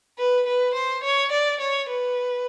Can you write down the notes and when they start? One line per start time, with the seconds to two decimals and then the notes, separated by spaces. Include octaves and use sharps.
0.18 B4
0.47 B4
0.74 C5
1.03 C#5
1.32 D5
1.60 C#5
1.90 B4